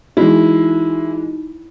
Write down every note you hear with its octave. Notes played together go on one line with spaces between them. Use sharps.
E3 G#3 D#4 E4 F#4